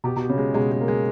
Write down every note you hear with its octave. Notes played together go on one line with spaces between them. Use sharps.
B2 G4
B2
G4
C#3
G#3
B2 G#3
G#3
A#3
G#3